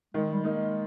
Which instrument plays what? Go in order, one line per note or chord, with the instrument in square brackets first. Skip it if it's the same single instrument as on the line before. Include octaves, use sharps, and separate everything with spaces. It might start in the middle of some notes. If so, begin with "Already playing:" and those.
[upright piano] D#3 [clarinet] G#3
[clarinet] G3
[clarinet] G#3 [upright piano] A#3 D#4